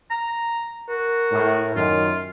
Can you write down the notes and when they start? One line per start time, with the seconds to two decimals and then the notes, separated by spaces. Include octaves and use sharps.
0.10 A#5
0.89 F#4 A#4
1.33 A2
1.76 F#2 D#3 F4